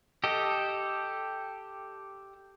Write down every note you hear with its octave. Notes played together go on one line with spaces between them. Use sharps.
G4 A4 D#5